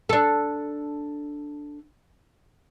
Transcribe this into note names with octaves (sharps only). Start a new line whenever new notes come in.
D4 A4